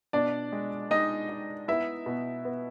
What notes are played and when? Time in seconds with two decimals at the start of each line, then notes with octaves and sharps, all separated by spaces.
0.13 B2 D4 D5
0.52 G#3
0.90 G#3 D#4 D#5
1.29 D#4
1.68 B3 E4 E5
2.06 B2
2.45 B3